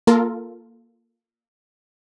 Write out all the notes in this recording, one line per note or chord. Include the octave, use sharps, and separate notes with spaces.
A#3 F4 A4 A#4